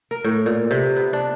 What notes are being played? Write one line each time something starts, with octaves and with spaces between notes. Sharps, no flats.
A#4
A2
A#2
C3
B3
D4